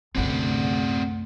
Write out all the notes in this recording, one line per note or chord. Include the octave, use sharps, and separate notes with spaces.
C2 F#2 D3 A3 C4 D5 F#5